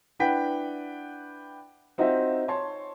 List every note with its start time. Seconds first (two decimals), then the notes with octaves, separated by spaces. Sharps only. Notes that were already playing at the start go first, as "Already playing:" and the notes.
0.19 D4 E4 B4 F#5 G5 B6
1.98 C4 D#4 F4 F#4 C5 E5
2.48 C#5 A5 C6